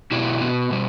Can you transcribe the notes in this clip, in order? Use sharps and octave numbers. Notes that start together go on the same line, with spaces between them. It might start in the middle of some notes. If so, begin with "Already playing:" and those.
B2 B3 E4 G4
B2 B3
B2 G3